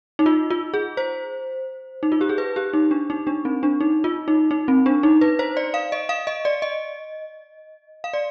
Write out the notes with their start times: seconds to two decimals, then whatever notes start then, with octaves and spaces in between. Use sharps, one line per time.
0.19 D#4
0.26 F4
0.50 F4
0.74 G#4
0.97 C5
2.03 D#4
2.12 F4
2.21 G4
2.29 G#4
2.38 B4
2.56 G4
2.73 D#4
2.91 D4
3.10 D#4
3.27 D4
3.45 C4
3.63 D4
3.81 D#4
4.04 F4
4.28 D#4
4.51 D#4
4.68 C4
4.86 D4
5.03 D#4
5.21 B4
5.39 C5
5.57 D5
5.74 F5
5.92 D#5
6.09 F5
6.27 D#5
6.45 D5
6.62 D#5
8.04 F5
8.13 D5